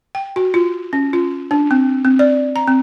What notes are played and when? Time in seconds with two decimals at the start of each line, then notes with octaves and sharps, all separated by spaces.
0.15 G5
0.36 F#4
0.54 F4
0.93 C#4
1.13 F4
1.51 D4
1.71 C4
2.05 C4
2.19 D5
2.56 A#5
2.67 C4